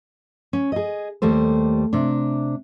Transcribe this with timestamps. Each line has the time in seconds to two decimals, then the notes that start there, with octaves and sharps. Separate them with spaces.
0.53 C#4
0.72 G#4 D#5
1.22 D#2 G3 A3 C5
1.93 C3 D4